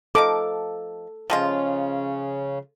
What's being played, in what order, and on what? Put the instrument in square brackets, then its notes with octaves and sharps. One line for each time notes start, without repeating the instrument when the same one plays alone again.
[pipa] F3 D#4 F5 [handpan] A4 [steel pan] D6
[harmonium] C#3 [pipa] F3 G#3 F4